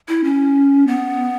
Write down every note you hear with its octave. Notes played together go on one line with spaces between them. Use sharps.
E4
C#4
B3